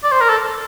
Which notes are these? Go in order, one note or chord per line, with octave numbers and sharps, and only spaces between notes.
D5
C5
A#4
A4